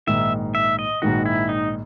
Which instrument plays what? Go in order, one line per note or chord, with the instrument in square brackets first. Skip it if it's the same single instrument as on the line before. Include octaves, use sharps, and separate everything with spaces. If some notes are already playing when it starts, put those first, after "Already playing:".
[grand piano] A#1 G#2 D#3 [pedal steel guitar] E5
[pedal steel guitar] E5
D#5
[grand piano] A#1 G#2 D#3 [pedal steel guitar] F#4
[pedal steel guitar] E4
D#4